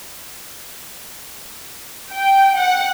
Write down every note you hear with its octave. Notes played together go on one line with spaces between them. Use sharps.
G5
F#5